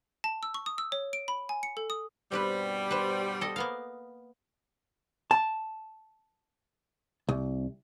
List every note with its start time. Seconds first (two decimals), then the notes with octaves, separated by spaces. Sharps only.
0.24 A5
0.43 E6
0.54 C#6
0.66 D#6
0.78 E6
0.92 C#5
1.13 D7
1.28 B5
1.49 G#5
1.63 C#7
1.77 A4
1.90 D#6
2.32 G2 B2 G3 C4 G4 B4
2.91 B4 C5
3.41 A4 D#5
3.56 A#3 B3 F5
5.31 A5
7.29 C2